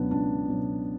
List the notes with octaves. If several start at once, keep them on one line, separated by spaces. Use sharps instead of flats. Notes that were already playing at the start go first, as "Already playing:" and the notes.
Already playing: C#2 B2 F#3 B3 D4
C#2 D4
B2 F#3